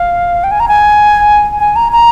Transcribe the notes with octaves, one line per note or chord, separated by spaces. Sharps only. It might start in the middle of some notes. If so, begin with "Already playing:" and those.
Already playing: F5
G5
G#5
A#5
G#5
G#5
A#5
A#5